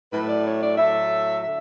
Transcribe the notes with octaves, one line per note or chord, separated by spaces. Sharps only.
A2 F#3 A3 B4
D5
C#5
D5
A2 F#3 A3 E5
D3 E5